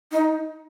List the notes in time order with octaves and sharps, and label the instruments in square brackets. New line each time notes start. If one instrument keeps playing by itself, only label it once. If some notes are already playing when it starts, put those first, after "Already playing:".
[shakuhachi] D#4